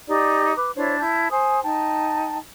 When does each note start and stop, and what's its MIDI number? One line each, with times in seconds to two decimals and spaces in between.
0.08 0.53 63
0.08 0.53 67
0.08 0.53 74
0.56 0.71 71
0.56 0.71 86
0.76 0.98 62
0.76 0.98 64
0.76 0.98 72
0.76 0.98 73
1.00 1.28 64
1.00 1.28 81
1.00 1.28 91
1.31 1.59 72
1.31 1.59 80
1.31 1.59 87
1.63 2.37 63
1.63 2.37 79
1.63 2.37 81